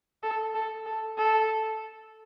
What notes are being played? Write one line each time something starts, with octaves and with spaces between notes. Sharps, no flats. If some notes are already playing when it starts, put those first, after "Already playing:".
A4
A4
A4
A4